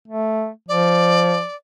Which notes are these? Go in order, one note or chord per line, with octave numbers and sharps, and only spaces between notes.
A3
F3 D5